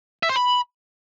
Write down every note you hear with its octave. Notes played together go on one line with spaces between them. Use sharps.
E5
C5
B5